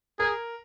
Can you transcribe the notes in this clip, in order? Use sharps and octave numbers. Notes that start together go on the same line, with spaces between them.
G#4 A#4